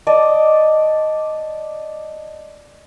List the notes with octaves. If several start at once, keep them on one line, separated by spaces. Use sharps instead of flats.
D5 D#5 A5